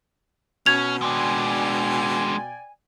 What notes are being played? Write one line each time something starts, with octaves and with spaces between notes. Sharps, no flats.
B2 C#4 G#6 F7
G#3 D4 D5 G5 G#5